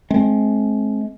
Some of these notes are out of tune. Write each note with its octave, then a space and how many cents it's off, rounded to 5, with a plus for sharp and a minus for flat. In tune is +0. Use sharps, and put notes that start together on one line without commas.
G#3 +40 C4 +25